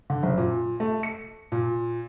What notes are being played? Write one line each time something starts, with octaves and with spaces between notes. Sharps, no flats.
D3
F#1
A#2
A3
C#7
A#2